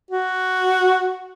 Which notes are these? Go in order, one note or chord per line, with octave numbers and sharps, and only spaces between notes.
F#4